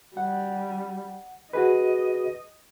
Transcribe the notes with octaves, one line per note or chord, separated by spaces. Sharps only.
G3 F#5
F#4 G#4 B4 D#5